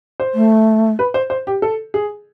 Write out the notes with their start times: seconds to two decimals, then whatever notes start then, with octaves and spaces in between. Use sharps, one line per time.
0.20 C5
0.34 A3
0.99 B4
1.14 C5
1.30 C5
1.47 G4
1.62 A4
1.94 G#4